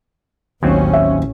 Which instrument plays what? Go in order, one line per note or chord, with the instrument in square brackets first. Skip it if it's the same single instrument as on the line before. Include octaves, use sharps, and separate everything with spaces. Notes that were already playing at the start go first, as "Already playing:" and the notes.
[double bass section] A1 C#4 [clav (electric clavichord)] D#2 F#3 C4
[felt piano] E5